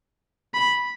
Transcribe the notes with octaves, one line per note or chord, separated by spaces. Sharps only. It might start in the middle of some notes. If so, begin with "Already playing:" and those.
B5